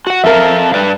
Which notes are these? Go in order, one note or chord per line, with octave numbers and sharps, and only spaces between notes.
F#4 F#5
F2 A4 A#4 E5 F5
G2 B4 D5